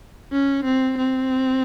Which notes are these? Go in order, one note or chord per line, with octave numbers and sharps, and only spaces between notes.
C#4
C4
C4